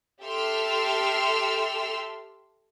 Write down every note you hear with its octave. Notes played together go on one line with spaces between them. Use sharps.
G4 A4 E5 C6 E6 F6